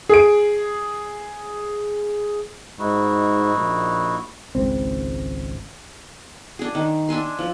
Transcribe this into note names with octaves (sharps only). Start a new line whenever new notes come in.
G#4 D7
G#2 D#4 E4 F#4
A#1
G#1 C#2 C4
D4 G#4
D#3
D4 E5 G#5 C6
F3